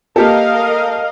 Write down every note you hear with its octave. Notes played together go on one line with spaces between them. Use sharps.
A#3 G4 A4 A#4 D#5 F5